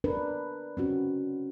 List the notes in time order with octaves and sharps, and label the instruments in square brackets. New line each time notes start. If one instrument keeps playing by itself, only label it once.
[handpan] D4 A#4 B4
C4 C#4 F#4